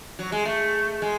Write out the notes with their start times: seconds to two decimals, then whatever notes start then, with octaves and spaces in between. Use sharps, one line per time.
0.19 F#3
0.32 G#3
0.45 A3
1.02 G#3